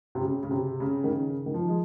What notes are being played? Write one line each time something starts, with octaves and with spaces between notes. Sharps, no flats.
C3
C#3
C#3
C3
C#3
D#3
C#3
D#3
F3
G#3